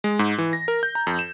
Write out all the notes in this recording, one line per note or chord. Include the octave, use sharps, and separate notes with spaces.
G#3
G#2
E3
A#6
A#4
G6
A#5
F2
E7